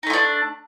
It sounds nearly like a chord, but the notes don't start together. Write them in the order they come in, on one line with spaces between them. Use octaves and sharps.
D#4 A3 F4 D4